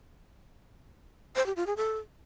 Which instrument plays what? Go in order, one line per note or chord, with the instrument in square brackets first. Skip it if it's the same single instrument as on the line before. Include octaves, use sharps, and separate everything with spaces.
[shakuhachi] C5
G4
F4
G#4
A4